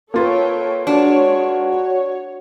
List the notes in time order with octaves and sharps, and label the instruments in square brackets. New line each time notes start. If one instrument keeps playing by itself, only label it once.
[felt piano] A#3 F4 B4 [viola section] A4 C#5 G5
[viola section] G#3 C#5 [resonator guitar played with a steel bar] D4 [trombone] F#4
[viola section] C#5